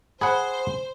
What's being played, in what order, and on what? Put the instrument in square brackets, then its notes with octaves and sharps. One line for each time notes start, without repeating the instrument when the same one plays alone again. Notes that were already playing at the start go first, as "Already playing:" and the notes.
[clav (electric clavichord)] G#4 F#5 [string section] C5 [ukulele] B5